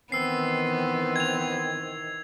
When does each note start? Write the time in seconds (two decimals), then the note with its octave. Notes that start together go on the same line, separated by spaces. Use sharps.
0.12 D#3 E3 B3 C4 E6 C7
1.16 G#6 F7